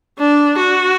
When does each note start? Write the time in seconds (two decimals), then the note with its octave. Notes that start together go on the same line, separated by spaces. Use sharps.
0.19 D4
0.57 F#4